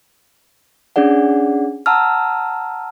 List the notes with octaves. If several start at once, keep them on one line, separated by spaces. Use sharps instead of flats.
C#4 D4 G#4 D5 F#5
F#5 A5 A#5 E6 F6